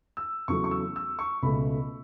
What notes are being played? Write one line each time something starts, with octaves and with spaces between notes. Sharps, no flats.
E6
E2 C#3 F#3 A3 C#6
C#6
E6
E6
C#6
C#2 B2 A3 B5